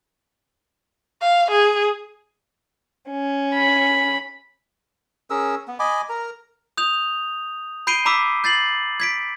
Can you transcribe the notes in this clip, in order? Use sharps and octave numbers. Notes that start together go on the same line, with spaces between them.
F5
G#4
C#4
B5
C#4 G#4 A#4 E6
B3
D#5 G#5 B5 D6
A#4 A#5
D#6 G6 F7
B5 G6 C7 D7 D#7 G7
A#5 B5 D6 E6 B6
G6 A6 C7 F#7
G#6 B6 D7